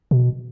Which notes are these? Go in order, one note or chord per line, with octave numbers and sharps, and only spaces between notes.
B2